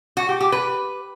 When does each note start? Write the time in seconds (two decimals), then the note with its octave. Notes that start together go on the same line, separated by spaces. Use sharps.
0.17 F#4
0.29 G4
0.41 G4
0.52 B4